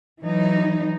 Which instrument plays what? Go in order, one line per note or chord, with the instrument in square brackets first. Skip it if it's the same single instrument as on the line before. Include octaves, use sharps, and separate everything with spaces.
[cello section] E3 F#3 D#4